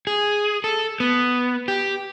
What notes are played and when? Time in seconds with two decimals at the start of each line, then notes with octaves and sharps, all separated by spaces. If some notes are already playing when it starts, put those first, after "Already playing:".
0.07 G#4
0.64 A4
1.00 B3
1.68 G4